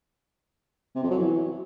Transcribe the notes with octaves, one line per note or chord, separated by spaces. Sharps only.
C3
F2
F#3
E3